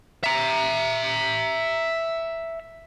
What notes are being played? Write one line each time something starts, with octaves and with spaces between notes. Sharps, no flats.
E5 A#5